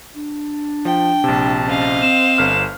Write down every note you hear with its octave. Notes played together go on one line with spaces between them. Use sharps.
D4
F3 G5
A#1 C3 A5
C#4 C5 D#5 F5
C4 E7
G1 F6